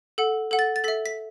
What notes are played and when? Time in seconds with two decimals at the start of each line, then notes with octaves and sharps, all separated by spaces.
0.18 A4 F#5
0.51 A4 F#5
0.59 A6
0.76 A6
0.84 A4 E5 B6
1.06 B6